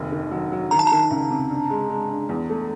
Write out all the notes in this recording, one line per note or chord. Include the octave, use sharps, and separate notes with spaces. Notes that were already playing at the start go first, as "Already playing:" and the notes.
Already playing: F1 D#2
D#3
F#3
F#3
D#3 A#5
A5
D#3 A#5
C#2
C3
G2
G#3
G#3
G2
E2
A3